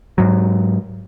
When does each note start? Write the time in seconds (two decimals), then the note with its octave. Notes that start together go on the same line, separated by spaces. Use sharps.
0.18 G#2 F#3